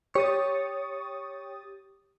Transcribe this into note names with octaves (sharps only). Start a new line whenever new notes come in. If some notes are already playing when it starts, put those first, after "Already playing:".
G4 C#5 D#6 A6